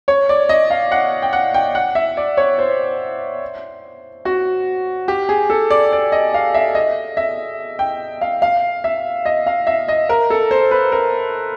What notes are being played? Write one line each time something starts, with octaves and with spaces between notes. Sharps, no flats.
C#5
D5
D#5
F5
F#5
G5
F#5
G5
F#5
E5
D5
C#5
C5
F#4
G4
G#4
A4
D5
D5
D#5
F5
E5
D#5
E5
G5
F5
F5
E5
D#5
F5
E5
D#5
A#4
A4
C5
B4
A#4